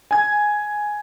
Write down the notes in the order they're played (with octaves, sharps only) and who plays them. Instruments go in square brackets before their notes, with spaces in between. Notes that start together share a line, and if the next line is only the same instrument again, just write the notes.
[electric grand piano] G#5 G#6